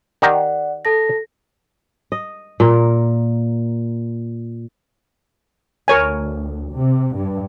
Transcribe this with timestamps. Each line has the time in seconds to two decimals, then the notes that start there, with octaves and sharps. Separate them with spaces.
0.22 D#3 G4 D5 F#5 A#5
0.85 A4 A5 A#6
2.12 D#5
2.60 A#2 A#4
5.88 D2 A#4 C#5 G#5
6.70 C3
7.14 G2